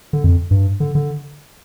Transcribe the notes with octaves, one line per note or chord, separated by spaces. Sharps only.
D3
F2
G2
D3
D3